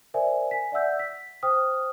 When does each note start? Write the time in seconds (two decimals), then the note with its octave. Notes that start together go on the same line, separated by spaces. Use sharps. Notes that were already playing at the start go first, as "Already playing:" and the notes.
0.14 A#4 C5 D5 E5 G#5
0.51 G#5 B6
0.72 D5 E5 F#5 E6 G6
0.99 B6
1.43 C5 G5 D#6 F6